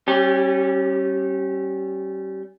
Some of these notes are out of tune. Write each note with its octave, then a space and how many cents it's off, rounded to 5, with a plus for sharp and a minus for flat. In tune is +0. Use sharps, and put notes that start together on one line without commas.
G3 -30 C#4 -25 G4 +15